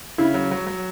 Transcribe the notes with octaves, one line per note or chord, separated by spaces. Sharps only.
C#3 E4
F#3
F#3
F#3